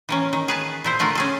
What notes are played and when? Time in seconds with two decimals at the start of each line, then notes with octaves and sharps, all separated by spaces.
0.09 E3 A#3 C#4
0.33 D#3
0.48 G#4 B4 A5
0.84 A#2 E4 C5
0.99 D3 A3 F4 A#4 F#5
1.15 C#4 G#4 A4